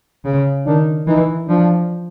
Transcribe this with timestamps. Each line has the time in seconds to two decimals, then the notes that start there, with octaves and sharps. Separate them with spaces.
0.25 C#3
0.66 D#3 D4
1.07 E3 D#4
1.49 F3 D4